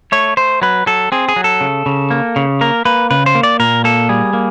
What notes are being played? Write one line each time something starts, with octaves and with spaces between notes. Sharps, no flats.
A3 C#5
A3 C5
F#3 B4
F#3 A4
C4 G#4
G#4
F#3
A4
C#3
C#3
A#3
C#3
A#3 A#4
A#3 B4
C#3 B4
C5
A#3
D5
A#2 A#4
A#3 A4
G3 G#4
A#3